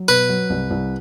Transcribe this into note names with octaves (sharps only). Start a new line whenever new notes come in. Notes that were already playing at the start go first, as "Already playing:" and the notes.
Already playing: F#3
B2 B4
F#3
C2
C2